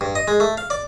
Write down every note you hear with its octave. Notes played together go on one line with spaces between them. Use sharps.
G2
D#5
G#3
A3
F5
D5